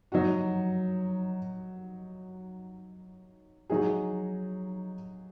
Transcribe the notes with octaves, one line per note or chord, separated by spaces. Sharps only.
F#3 D#4 F#4
F#3 D#4 G#4